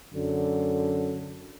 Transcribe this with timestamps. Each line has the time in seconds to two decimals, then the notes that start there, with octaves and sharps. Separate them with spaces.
0.13 F#2 D3